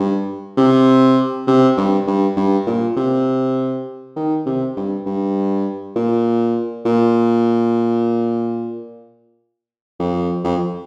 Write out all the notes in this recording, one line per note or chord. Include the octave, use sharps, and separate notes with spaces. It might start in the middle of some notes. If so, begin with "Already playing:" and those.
Already playing: G2
C3
C3
G2
G2
G2
A#2
C3
D#3
C3
G2
G2
A#2
A#2
F2
F2